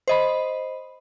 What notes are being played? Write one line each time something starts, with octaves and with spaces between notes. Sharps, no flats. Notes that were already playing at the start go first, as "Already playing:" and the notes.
C5 D#5 B5